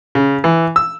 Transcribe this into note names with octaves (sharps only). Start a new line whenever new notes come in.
C#3
E3
E6